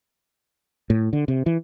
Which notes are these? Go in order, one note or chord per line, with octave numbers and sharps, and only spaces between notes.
A2
D3
C3
E3